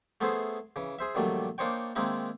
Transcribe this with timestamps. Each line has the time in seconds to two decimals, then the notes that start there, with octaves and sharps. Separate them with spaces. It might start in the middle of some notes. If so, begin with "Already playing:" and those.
0.21 A3 B3 E4 G#4 C5
0.76 C#3 E3
0.99 G#4 C5 E5
1.15 A#1 A#2 D#3 F#3 G3 A3
1.58 A#3 D4 D#4 C5 C#5 G5
1.96 D#3 G#3 A#3 C4 D#4 E4